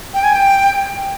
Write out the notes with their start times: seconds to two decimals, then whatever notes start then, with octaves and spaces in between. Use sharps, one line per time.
0.14 G5
0.23 G#5
0.32 G5